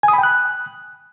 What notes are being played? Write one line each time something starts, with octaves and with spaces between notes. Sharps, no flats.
G#5
D#6
B5
G5
F#6